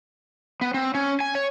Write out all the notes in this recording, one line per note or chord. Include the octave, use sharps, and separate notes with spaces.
B3
C4
C#4
G#5
C#5